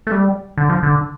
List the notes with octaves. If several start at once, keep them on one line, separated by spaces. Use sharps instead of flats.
A3
G3
D3
F3
D3